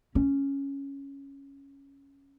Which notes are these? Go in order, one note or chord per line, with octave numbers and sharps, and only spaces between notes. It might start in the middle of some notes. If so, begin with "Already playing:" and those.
C#4